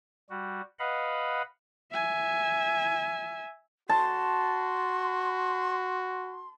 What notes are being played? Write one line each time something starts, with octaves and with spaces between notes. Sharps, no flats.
G3 F#4
B4 D#5 F5 F#5 B5
E5 G#5
F#4 A5 C6